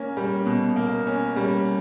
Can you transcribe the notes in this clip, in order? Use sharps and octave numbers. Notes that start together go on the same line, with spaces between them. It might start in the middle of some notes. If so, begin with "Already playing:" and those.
Already playing: A#3 C#4
G3
B2
A#3
C#4
G3